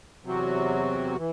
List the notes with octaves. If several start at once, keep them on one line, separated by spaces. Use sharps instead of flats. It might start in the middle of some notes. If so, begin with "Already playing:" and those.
E2 C3 F#3 C4 F#4
E3